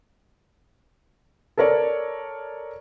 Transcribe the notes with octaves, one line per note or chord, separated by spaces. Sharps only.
A4 A#4 C#5 D5